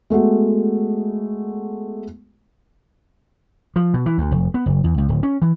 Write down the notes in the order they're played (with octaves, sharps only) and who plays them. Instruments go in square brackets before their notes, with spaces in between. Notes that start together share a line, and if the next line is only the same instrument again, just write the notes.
[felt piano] G#3 A3 B3 F#4
[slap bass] F3
B2
E3
D2
F1
B3
F#1
E2
C#2
D1
C#4
E3